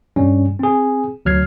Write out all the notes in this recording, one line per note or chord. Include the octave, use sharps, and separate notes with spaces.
G2 G3 C#4
C4 G#4
D2 F#3 F6 G#6 C7